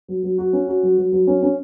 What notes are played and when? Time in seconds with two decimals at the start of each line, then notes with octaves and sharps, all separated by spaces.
0.08 F#3
0.23 F#3
0.38 F#4
0.53 C#4
0.68 F#4
0.83 F#3
0.98 F#3
1.12 F#3
1.27 C#4
1.43 C#4